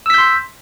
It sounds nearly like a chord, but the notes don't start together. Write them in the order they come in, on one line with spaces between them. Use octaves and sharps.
E6 B6 G6 C6